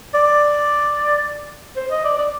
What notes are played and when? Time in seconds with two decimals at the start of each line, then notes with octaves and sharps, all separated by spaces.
0.14 D5
1.76 C5
1.91 D#5
2.04 D5
2.18 D5